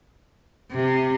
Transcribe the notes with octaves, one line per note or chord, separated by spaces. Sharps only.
C3